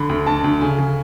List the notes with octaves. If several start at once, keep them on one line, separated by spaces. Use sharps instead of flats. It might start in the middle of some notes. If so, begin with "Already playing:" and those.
Already playing: D3 B5
D2
D2 A5
D2
C#3 G#5
C#3